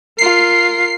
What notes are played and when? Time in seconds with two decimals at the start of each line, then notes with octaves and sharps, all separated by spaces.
0.18 F4 A#4 C7